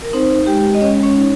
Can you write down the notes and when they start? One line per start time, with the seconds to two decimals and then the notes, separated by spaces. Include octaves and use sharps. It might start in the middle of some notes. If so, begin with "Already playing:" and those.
0.02 A#4
0.13 C4 D#4 C5
0.46 G#3 G4 G5
0.74 D#5
0.80 G#3 C#4 C#5
1.03 C#4 C#5
1.15 D#4